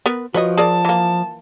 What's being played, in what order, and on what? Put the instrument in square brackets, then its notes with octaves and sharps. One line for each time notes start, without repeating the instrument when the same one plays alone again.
[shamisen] B3 A#4 B4
[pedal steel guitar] F3 [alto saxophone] F#4 [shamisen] B4 C#5 D#5
[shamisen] G#4 A#4 D5 [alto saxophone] A5
[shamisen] E3 A#3